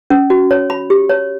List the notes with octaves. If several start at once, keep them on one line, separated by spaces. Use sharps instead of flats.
C#4
F#4
C#5
B5
G4
C#5